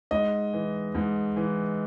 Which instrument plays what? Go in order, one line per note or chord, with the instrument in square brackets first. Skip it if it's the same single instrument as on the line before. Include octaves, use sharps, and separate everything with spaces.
[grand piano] G#2 D#5
E3
G#2
E3